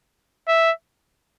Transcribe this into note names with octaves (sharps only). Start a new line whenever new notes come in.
E5